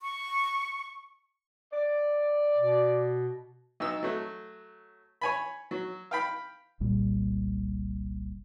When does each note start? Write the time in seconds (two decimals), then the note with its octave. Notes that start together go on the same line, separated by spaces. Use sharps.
0.02 C#6
1.72 D5
2.57 B2
3.80 B1 D#4 E6
4.03 F#3 A3
5.21 C#5 G#5 B5
5.71 F#3
6.11 F5 G5 B5
6.80 F#1 C2 A#2 G3